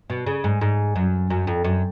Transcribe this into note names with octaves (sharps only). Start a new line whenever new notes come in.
B2
C#3
G#2
G#2
F#2
F#2
F2
F#2